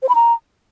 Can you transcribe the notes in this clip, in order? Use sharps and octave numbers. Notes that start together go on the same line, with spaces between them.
C5
B5
A#5